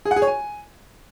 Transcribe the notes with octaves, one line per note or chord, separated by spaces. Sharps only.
G#4
F#5
G#4
C#5
G#5